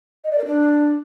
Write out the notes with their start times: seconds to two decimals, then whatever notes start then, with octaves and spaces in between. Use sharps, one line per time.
0.24 D#5
0.31 D5
0.38 A#4
0.45 D4